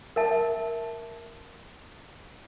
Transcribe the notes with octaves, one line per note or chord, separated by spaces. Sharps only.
A#4 E5 A5